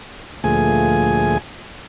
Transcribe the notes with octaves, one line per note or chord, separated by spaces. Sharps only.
D2 A#2 F3 A3 G#4 G#5